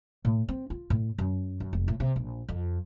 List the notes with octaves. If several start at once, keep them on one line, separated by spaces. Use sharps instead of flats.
A2
C4
F4
A2
F#2
F#2
F1
A2
C3
A#1
F2